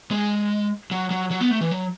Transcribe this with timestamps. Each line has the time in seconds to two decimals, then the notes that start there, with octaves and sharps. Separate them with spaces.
0.11 G#3
0.91 F#3
1.11 F#3
1.31 F#3
1.41 B3
1.51 A3
1.61 E3
1.71 F#3